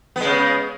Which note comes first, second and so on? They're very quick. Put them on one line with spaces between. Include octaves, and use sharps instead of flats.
B3 G#3 C#3